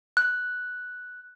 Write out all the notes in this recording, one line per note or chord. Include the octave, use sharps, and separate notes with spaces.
F#6